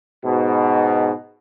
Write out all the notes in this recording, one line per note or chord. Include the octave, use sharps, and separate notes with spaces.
G#2 B2